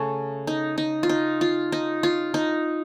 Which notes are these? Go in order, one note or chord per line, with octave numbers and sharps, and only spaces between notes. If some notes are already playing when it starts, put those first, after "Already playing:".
Already playing: C#3 A3 C#4 A4
D#4
D#4
F4
D#4
F4
D#4
F4
D#4